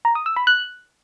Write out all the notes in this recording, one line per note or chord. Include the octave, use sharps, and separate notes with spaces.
A#5
D#6
E6
B5
F#6